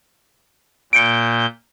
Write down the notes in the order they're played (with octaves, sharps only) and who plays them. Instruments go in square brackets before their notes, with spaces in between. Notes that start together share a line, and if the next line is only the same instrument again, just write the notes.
[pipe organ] A#2 G6 [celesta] C#7 D7